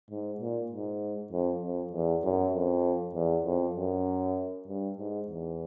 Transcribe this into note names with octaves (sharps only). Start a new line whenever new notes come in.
G#2
A#2
G#2
F2
F2
E2
F#2
F2
E2
F2
F#2
G2
G#2
E2